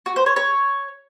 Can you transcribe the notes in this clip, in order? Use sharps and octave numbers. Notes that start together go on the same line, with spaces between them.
F#4
C5
C#5
C#5